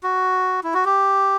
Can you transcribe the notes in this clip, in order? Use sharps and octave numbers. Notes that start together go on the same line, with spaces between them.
F#4
E4
F#4
G4